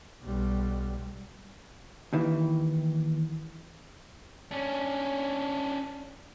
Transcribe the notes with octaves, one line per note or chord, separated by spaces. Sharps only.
B1 G3
D#2 D#3 E3
C#4 D4